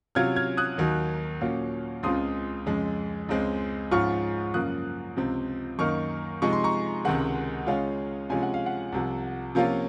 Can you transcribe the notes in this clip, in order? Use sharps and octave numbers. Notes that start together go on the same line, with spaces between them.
C3 F#3 C#4 F4 F6 G#6
F6 G#6
D#6 F#6
D#2 D#3 F#3
A#2 F#3 A#3 C#4
C#2 C#3 G#3 C4 F4 C6 D#6
F2 C#3 G#3
C#2 C#3 G#3 C4
G#2 F3 G#3 C#4 F4 C#6 F6
F#2 C#3 F3 A#3 D#6 F#6
C#2 C3 F3 C4
F#2 D#3 A#3 D#4 C#6 F6
C3 F3 G#3 D#4 C#6
C6
A#5 C#6
C#2 C3 D#3 G#3 F#5
C#3 G#3 C#4 F4 F5
C3 F3 G#3 C#4 F4 G#5
F#5
F5
F#5
C2 C3 F3
C3 F3 A#3 C#4 F4